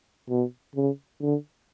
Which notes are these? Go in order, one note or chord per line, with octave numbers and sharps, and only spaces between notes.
B2
C#3
D3